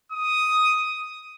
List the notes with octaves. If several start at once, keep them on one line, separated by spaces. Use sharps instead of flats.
D#6